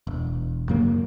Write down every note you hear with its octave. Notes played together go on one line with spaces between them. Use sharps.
E1
F#2 C#3 F#3 A#3